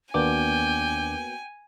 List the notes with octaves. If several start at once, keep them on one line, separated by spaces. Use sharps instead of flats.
D#2 A#3 B3 D4 F#4 G5 G#5 D6